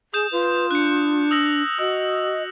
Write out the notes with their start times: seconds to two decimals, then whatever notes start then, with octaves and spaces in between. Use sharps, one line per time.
0.14 G#4 D#6 G6 E7
0.32 F4 B4
0.71 D4 F#6 C#7
1.31 D#6 E6 A#6
1.79 F#4 D#5 E6